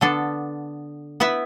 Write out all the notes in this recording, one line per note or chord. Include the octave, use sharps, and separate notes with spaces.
D3 B3 D4 A4
B3 E4 B4 E5